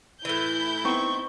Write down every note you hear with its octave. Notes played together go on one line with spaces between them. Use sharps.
A2 E3 E4 G6
B3 C4 D#4 C#6